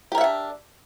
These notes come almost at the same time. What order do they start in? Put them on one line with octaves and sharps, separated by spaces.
G4 A#4 E5 F#5 D4